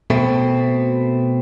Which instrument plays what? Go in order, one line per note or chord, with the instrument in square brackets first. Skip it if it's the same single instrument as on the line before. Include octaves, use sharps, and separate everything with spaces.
[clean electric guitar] B2 A3 C4